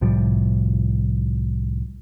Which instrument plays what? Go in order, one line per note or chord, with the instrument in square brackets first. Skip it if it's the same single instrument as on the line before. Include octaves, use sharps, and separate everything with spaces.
[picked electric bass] C2 A2 F3 G3